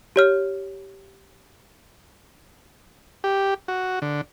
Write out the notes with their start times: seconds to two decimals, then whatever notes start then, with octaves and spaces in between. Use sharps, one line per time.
0.16 G4 C#5 F6
3.24 G4
3.68 F#4
4.02 D3